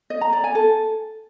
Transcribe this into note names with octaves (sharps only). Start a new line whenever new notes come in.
D#5
A#5
D5
G#5
A4